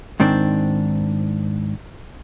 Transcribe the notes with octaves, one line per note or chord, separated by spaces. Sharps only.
G#2 D#3 C4 D4